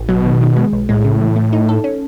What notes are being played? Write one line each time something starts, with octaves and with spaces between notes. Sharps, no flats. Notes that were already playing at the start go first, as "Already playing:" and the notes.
Already playing: A1
B2 F#3
D#3
D#3
G#3
B1
A2 G#3
C#3
E3
A3
D#4
A4
C#4